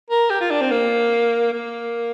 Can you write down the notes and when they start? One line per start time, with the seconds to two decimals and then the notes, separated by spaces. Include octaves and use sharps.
0.10 A#4
0.30 G4
0.41 F4
0.51 D4
0.61 C4
0.71 A#3
1.53 A#3